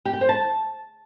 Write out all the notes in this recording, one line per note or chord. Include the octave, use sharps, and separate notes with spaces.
G4
G5
C5
A5